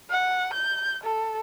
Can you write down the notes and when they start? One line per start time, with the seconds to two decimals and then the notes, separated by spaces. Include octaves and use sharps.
0.11 F#5
0.54 G6
1.04 A4